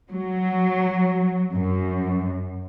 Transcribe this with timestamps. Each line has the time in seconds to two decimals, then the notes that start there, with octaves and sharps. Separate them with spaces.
0.11 F#3
1.54 F#2